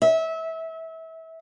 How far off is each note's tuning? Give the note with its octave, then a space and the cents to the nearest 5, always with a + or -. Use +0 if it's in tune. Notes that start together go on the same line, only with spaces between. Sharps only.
E5 -25